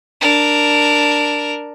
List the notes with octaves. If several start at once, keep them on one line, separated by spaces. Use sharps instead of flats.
D4 A#4